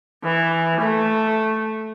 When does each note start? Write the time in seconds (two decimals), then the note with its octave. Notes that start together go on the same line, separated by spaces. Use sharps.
0.24 E3
0.81 A3